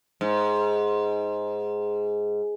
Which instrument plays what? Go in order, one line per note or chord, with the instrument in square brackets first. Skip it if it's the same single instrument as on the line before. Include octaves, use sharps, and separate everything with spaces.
[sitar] G#2